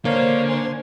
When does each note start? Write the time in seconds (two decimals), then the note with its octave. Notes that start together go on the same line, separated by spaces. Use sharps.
0.05 D3 A#3 D4 C5 C#5 F5
0.48 G#5 C6